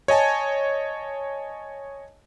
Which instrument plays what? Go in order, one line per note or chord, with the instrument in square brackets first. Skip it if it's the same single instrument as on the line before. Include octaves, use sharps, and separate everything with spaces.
[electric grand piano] C#5 D#5 G#5 A5